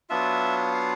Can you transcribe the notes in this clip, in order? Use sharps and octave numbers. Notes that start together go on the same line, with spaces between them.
F#3 B3 D4 F4 E5
F5